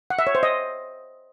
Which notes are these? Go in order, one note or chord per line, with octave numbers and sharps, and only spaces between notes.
F#5
E5
C#5
C5
D#5